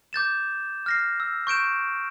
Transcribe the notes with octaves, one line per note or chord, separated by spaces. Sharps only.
D6 G6 A6 E7
F6 A#6 C7
E6
C#6 G6 D7 E7